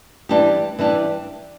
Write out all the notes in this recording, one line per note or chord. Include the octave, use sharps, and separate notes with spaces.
E3 G3 D4 G4
E3 G3 D4 G4